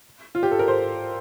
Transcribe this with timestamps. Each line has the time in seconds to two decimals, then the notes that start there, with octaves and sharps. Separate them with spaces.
0.35 F4
0.43 G4
0.51 A4
0.59 A#4
0.68 C5